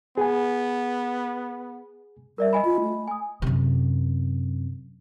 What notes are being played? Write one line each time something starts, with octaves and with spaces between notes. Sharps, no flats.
B3 G#4 G#5
G3 A#4 D5 E5
D#5 G#5 B5
F4
A3
G#5 D#6
F#2 C3